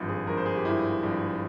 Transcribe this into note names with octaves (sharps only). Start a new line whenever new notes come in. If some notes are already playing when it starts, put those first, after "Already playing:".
Already playing: G#1 G2 F3
G#4
G#1 G2 F3 A#4
C5
G#4
G4
G#1 G2 F3 E4
G#1 G2 F3